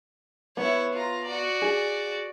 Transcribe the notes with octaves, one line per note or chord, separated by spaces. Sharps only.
B3 E4 C#5
F4 A#5
F#4 D5
G#4